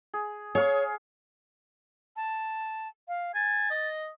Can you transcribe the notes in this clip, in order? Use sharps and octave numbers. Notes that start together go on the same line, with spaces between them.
G#4
G#4 C#5 F5 C#6
A5
F5
G#5 A6
D#5